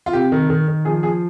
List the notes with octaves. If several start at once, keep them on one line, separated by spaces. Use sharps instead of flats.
F4
C3 G4
D#3
D#3
D#3
F3 G#4
F3 G#4